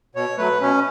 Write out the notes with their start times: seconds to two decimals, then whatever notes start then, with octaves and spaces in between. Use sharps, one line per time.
0.15 B2 C#5
0.38 F#3 A3 B4
0.62 B2 C#4